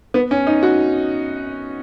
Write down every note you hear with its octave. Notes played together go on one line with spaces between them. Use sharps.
B3
C#4
D#4
F#4